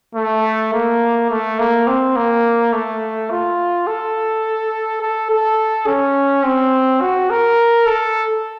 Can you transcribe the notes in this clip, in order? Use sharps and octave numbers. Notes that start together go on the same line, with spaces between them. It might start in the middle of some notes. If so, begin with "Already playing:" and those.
A3
A#3
A3
A#3
C4
A#3
A3
F4
A4
A4
A4
C#4
C4
F#4
A#4
A4